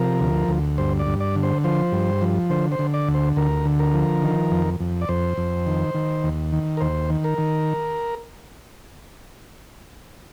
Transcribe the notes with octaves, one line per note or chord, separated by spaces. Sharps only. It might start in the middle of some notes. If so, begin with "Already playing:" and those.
Already playing: C3 F3 A#4
D2
D2
G2 C5
D5
G2
D5
D3
C5
F3 C5
G2
F3
D3 C5
C5
D3
D5
D2
C5
D2 A#4
D3
A#4
F3
D#3
F2
F2
D5
F2 C5
F2
D#3
D#3
D#2
D#3
A#4
D#2 C5
D#3
A#4
D#3